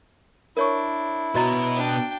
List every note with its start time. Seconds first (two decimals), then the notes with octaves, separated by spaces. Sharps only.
0.57 D4 E4 A#4 C#5 C#6
1.35 B2 F#4 B4 C#5 D#5 A#5
1.75 D4 G5